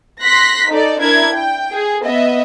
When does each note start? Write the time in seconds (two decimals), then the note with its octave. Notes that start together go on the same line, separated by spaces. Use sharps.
0.21 C6 F#6 A#6 B6
0.71 D#4 A4 D5
1.01 D4 E4 A#4 G#6
1.35 G5
1.73 G#4
2.04 B3 D#5 E5